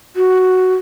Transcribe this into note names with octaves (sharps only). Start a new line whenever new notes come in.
F#4